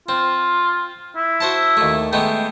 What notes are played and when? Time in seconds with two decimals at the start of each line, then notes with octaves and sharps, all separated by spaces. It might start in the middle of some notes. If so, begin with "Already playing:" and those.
0.09 C4 F4
1.17 E4
1.40 F#4 C5 A5
1.77 D#2 A3
2.13 G#3 A3 B3 G5